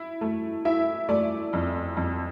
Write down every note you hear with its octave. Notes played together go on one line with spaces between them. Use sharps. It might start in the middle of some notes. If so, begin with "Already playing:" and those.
Already playing: E4
A3
E4 E5
A3 D5
F2
F2